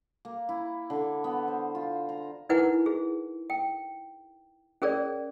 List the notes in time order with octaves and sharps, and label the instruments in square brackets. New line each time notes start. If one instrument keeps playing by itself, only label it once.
[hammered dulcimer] A#3
E4
D3
B3
C5
F4
A#5
[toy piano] D#4 E4 A#4 B4 F#5 G#5
G#4
G5
C#4 G#4 A#4 C#5 D5